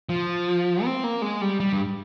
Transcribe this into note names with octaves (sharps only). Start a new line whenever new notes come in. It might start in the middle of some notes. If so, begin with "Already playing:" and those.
F3
C4
A#3
G#3
G3
G3
G2